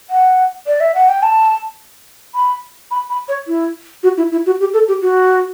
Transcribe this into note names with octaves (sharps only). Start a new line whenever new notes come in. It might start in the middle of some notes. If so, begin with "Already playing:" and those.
F#5
D5
E5
F#5
G5
A5
B5
B5
B5
C#5
E4
F#4
E4
E4
F#4
G4
A4
G4
F#4